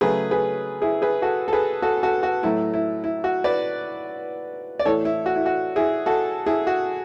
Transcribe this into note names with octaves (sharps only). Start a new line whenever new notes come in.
C#3 F#3 A3 G#4 B4
G#4 B4
E4 G#4
G#4 B4
F#4 A4
A4
G#4 B4
F#4 A4
F#4 A4
F#4
A2 F#3 A3 E4
E4
E4
F#4
B4 D5
D5
A2 E3 A3 A4 C#5
E4
F#4
E4
F#4
E4 G#4
F#4 A4
E4 G#4
F#4